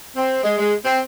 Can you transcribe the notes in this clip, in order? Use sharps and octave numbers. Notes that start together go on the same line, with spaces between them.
C4
G#3
G#3
C4